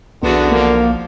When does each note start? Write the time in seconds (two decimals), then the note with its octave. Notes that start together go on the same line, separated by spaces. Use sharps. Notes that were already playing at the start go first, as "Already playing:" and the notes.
0.23 B1 E2 D3 B3 D4 F#4
0.52 F3 A#3